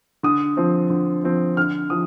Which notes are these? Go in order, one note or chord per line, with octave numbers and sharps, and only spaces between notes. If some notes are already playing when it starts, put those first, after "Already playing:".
D3 D#6
F3 C4
D3
F3 C4
D3 F6
F3 D#6